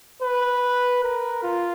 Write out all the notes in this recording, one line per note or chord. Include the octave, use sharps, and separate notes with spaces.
B4
A#4
F4